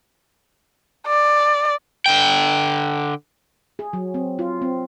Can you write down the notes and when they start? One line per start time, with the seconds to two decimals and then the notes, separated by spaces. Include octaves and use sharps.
1.07 D5
2.06 D3 G5
3.79 G#4
3.93 F#3
4.14 C4
4.39 F4
4.62 C4